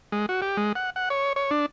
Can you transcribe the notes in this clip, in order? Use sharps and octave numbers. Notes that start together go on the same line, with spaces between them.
G#3
F#4
G4
G#3
F#5
F#5
C#5
C#5
D4